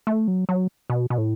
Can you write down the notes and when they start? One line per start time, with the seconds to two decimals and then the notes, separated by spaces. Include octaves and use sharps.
0.07 A3
0.28 F#3
0.49 F#3
0.90 B2
1.10 B2
1.18 A2